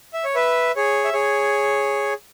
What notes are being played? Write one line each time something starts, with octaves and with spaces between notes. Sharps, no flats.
E5
C#5
B4 E5
G#4 C#5
E5
G#4 C#5